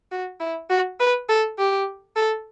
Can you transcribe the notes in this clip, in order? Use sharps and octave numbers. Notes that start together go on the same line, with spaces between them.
F#4
E4
F#4
B4
A4
G4
A4